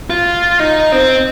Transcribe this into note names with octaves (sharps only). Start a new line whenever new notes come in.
F4
D#4
C4